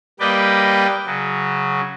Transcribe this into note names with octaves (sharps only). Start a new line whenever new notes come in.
G3 A#3 B4 D5 D#5 G5
C#3 F#3